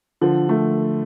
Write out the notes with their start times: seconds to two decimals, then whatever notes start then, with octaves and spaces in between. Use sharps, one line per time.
0.21 D3 F3
0.49 F3 A3